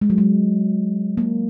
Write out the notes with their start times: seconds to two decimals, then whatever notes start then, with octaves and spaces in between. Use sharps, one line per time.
0.01 G#3
0.10 F#3
0.18 G#3
1.17 A#3